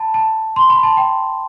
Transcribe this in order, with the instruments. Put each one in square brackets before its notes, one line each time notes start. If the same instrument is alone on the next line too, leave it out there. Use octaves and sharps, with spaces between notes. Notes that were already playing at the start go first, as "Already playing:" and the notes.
Already playing: [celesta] A5 B5
A5
C6
B5
A5
G5